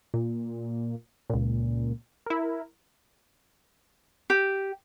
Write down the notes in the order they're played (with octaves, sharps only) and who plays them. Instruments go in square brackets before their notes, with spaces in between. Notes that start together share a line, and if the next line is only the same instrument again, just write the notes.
[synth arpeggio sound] A#2
C#2 A#2
E4 A#4
[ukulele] G4